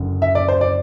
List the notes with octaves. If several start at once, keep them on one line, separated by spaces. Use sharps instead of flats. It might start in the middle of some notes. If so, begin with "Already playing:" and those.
Already playing: F#1 F#2 D3
E5
D5
C5
D5